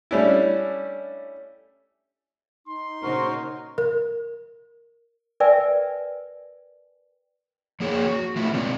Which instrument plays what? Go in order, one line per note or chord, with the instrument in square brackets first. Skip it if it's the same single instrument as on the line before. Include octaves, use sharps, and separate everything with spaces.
[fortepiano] G3 A3 C#4 D4 E4
[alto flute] D#4 [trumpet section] C6
[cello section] A#2 C#3 D#4 [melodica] F#4 A#4 [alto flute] C5
[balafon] A#4
[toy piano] A#4 B4 D5 E5 G5 G#5
[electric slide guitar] F3 A#3 G#4 C#5
F#4
D#3 A3 B3 E4 F4
B2 G#3 C4 D4